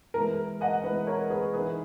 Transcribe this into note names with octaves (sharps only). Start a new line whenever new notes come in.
E3 G#3 B3 A#4
D#5 F#5
E3 G#3 B3 B4 D#5
A#4 C#5
G#4 B4
E3 B3 D#4 G#4 B4